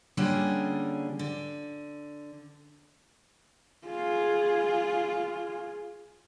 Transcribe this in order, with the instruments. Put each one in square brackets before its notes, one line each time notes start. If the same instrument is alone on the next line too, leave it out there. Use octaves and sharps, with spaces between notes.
[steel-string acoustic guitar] D3 G3 A#3 C#4 F4 G#4
D3
[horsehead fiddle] F4 G#4